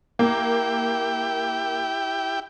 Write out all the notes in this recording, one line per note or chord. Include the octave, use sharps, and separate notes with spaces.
A#3 E4 G4 G5